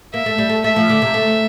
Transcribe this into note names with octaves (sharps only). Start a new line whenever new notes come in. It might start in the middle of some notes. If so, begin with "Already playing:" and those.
A#3 E5
A3
G3
A3
A3 E5
F3
D3
C3
A3